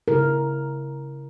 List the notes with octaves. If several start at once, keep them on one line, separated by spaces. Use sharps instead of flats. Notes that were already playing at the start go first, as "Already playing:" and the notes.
C#3 E4 A#4